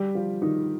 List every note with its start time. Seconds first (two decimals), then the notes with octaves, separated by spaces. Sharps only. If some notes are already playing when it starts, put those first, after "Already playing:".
Already playing: G3 G4
0.15 F3 F4
0.42 D#3 D#4